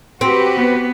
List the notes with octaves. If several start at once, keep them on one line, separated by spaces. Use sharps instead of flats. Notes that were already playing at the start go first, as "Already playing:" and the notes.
C4 F#4 G4 B4
B3